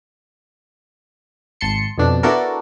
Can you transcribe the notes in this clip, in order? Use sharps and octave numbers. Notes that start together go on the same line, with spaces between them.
G#1 A5 C6 C#7
F2 B2 D4
B3 D4 E4 F#4 A4 A#4